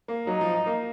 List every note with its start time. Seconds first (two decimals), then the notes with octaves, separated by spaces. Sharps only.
0.08 A#3
0.27 F#3 D#4
0.41 F3
0.66 A#3